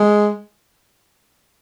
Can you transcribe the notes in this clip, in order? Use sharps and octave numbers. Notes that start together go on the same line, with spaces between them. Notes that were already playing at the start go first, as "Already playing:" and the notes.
Already playing: G#3